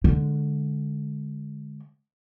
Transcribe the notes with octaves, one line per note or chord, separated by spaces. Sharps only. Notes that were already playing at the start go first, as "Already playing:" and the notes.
D3 G#3